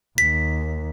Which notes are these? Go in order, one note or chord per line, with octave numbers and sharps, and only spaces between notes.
D#2 B6